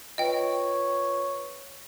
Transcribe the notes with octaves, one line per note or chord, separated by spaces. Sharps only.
F4 B4 C#5 D#5 G5